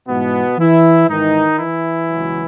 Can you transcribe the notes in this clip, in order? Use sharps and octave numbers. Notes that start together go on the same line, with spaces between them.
G#2 B2 E3 B3
E3 E4
G#2 D#3 E3 D#4
E3 E4
C#2 B2 F#3